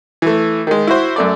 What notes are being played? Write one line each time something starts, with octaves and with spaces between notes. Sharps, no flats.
E3 A3
D#3 G#3
E4 F#4 C5
F#2 A3 D5